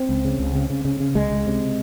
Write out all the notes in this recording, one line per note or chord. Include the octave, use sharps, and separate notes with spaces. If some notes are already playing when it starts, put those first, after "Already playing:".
Already playing: C4
C#2
C#3
C#2
C#3
C#3
C#3
C#3
C#2 G#3
C#2
C3